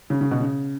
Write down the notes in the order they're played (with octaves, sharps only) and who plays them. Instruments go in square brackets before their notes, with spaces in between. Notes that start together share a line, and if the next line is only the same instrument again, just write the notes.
[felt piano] C#3
C#3
B2
C#3